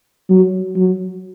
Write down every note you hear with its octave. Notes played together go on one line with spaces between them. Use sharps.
F#3
F#3